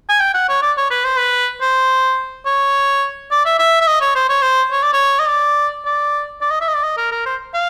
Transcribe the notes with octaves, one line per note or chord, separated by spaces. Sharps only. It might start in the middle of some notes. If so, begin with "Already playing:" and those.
G#5
G5
F#5
C#5
D5
C#5
B4
C5
B4
C5
C#5
D5
E5
E5
E5
D#5
C#5
C5
C#5
C5
C#5
D5
C#5
D#5
D5
D5
D5
D#5
E5
D#5
D5
D#5
A#4
A#4
C5
F5